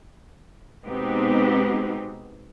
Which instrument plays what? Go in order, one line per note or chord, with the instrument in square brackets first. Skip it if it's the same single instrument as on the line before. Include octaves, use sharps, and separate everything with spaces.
[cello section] B2 G#3 B3 C4 D#4 G4